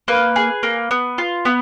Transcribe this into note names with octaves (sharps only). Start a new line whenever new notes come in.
A#3 B4
G#4
A#3
B3
F4
B3